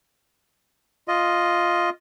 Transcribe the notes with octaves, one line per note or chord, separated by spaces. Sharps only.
F4 D#5